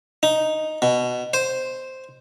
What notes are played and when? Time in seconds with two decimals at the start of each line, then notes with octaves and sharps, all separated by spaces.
0.23 D#4
0.82 B2
1.34 C5